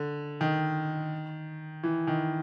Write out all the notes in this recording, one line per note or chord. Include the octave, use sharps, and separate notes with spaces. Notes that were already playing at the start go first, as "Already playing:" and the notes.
Already playing: D3
D#3
E3
D#3